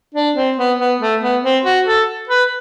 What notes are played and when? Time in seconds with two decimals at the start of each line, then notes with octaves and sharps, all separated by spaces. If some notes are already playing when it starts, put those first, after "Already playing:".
0.15 D4
0.36 C4
0.58 B3
0.79 B3
1.01 A3
1.22 B3
1.43 C4
1.65 F#4
1.87 A4
2.29 B4